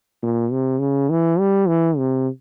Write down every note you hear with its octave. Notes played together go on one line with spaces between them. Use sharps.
A#2
C3
C#3
E3
G3
E3
C3